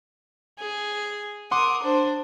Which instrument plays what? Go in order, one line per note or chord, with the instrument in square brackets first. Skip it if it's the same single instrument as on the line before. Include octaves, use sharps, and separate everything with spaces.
[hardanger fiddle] G#4
[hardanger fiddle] A#4 D#6 [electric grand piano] F#5 C6 D6
[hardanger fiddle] D4 C5